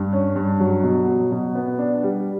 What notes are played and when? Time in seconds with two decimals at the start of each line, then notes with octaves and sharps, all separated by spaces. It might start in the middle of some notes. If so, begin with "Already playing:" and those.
Already playing: G2
0.13 C#4
0.36 G2
0.60 F#3
0.83 B2
1.08 F#3
1.32 B2
1.55 B3
1.79 D4
2.03 G3